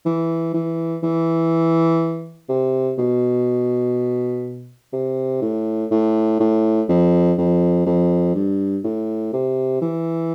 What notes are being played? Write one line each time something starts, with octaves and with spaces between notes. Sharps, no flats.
E3
E3
E3
C3
B2
C3
A2
A2
A2
F2
F2
F2
G2
A2
C3
E3